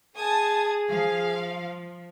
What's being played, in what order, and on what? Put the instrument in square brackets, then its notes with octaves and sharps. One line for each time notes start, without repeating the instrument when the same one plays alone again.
[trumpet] G#4 [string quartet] G#5 G#6 [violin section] A5 D#6
[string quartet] F3 [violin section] F5